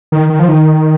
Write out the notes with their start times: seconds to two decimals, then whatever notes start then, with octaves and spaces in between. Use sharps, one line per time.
0.12 D#3
0.30 D#3
0.39 F3
0.48 D#3